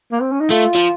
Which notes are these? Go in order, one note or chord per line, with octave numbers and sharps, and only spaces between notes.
A#3
C4
C#4
D#4
A3 F4
F3